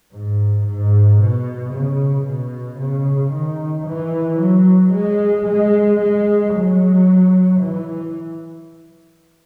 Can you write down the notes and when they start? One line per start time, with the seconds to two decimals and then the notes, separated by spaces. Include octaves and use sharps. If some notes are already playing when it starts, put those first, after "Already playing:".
0.13 G#2
0.67 G#2
1.19 B2
1.73 C#3
2.26 B2
2.79 C#3
3.33 D#3
3.87 E3
4.40 F#3
4.93 G#3
5.47 G#3
6.00 G#3
6.54 F#3
7.60 E3